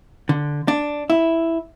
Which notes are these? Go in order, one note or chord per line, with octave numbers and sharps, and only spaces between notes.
D3
D4
E4